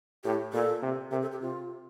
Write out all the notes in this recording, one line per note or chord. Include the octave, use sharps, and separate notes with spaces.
A2 G4
A#2 A4
C3
C3 A#4
A4
G4
C3 F4